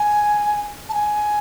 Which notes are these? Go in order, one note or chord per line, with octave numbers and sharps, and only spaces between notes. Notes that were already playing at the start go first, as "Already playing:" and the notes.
Already playing: G#5
A5
G#5